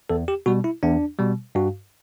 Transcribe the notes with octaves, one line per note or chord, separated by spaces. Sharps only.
E2 A4
G4
B2 G3 F#4
E4
E2 D4
B2 G3
G2 F#4